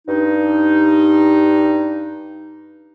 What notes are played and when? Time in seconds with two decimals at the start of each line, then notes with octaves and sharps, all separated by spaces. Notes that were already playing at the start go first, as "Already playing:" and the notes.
0.07 G2 D#4